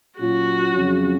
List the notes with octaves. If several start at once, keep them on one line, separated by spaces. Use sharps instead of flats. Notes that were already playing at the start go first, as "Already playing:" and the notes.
A#2 F#3 C#4 F4 F#4
F2 C#3 F#3 C#4